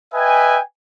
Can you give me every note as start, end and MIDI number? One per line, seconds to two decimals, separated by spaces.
0.14 0.59 71
0.14 0.59 75
0.14 0.59 76
0.14 0.59 79
0.14 0.59 80